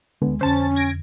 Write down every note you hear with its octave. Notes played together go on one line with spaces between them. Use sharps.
D2 D3 G#3 B3
F2 D3 C#4 C5 A5 A6
G#6 A#6 D7